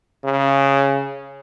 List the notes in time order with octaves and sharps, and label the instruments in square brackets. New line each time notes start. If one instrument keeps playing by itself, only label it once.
[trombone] C#3